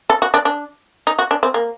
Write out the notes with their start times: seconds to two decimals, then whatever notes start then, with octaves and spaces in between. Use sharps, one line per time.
0.10 A4
0.22 F#4
0.34 D4
0.45 D4
1.07 D#4
1.19 F#4
1.31 D4
1.43 C4
1.54 A#3